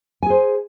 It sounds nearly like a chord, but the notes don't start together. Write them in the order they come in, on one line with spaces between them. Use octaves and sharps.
G#5 G#4 C5